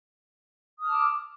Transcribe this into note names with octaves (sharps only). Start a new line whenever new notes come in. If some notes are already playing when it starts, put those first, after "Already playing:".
A5 D6 D#6 F6